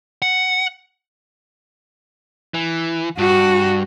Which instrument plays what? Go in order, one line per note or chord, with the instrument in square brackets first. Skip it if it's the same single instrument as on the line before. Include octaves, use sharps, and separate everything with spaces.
[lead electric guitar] F#5
E3
[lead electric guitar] G2 [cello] F#4